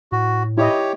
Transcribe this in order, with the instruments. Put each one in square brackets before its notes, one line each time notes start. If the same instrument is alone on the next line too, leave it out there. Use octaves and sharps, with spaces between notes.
[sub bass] A2 [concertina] F#4
[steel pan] E4 D#5 [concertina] G4 C#5